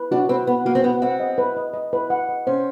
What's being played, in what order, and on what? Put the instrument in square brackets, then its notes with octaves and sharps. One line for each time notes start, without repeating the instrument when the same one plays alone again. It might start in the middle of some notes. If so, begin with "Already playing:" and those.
Already playing: [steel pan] B4
[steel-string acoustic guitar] D4 [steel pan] F#4
[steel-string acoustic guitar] C4 [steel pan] B4
[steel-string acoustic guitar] B3 [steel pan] B4
[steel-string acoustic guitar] A#3 [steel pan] F#4
[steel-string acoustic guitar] C4
[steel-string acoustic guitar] B3 [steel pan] B4
[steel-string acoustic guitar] C4 [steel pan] F#5
[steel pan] D#5
B4
D#5
D#5
B4
F#5
D#5
[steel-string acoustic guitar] C#4 [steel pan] C5